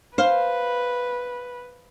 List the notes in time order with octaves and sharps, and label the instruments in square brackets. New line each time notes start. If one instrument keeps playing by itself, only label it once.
[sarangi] B4 [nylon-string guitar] C5 F5